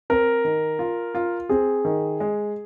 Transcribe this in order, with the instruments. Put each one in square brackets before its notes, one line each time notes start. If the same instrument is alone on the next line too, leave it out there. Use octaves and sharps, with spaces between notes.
[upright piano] C4 [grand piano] A#4
[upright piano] D#3
F4
F4
[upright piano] C4 [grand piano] G#4
[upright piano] D#3
G#3